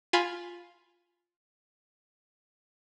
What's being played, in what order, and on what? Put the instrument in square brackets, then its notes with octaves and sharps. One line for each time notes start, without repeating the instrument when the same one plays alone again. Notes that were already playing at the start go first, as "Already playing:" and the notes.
[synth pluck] F4 G#5 B5